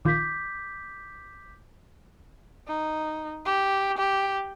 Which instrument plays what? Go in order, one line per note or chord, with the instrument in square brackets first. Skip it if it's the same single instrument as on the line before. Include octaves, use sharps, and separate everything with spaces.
[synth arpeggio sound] A#1 D#3 F4 [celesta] D6 G6 B6
[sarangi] D#4
G4
G4